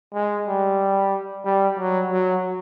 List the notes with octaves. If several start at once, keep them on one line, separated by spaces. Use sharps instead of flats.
G#3
G3
G3
F#3
F#3